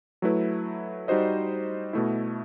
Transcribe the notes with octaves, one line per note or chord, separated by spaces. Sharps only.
F#3 A3 E4 B4
G3 D#4 F#4 C5 D#5
B2 A3 E4